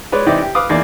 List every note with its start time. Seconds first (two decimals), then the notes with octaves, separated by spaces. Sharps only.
0.12 G#3 B4 C#5 D5
0.26 C3 E3 D#4 G4 D5 G5
0.42 G4
0.55 B4 F5 D6 D#6
0.69 E2 A#3 D#4 D5